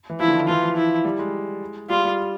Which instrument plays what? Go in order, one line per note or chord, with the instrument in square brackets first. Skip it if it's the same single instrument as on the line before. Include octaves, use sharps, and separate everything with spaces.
[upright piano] E3
[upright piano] F3 [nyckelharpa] E4
[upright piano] D3
D#3
[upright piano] E3 [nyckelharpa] F4
[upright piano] F3
[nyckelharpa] E4
[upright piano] G3
G#3
[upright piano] G3 [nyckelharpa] F4
[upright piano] G3